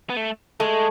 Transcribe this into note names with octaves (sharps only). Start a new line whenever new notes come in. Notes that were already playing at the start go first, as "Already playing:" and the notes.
B3
A3
G#3 A3